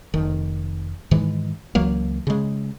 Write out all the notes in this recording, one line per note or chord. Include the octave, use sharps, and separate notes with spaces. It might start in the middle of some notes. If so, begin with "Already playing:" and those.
F1 D#3
G#2 D#3 E3 G#3
C#2 E3 F#3 A#3
C#3 G#3